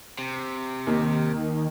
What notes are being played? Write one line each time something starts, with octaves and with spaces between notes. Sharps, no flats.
C3
D#2 D#3